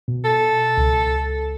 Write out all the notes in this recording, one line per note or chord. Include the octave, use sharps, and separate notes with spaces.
B2
A4
C#2